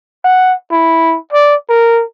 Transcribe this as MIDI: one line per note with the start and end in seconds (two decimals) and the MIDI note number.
0.24 0.54 78
0.72 1.17 64
1.33 1.55 74
1.69 2.03 70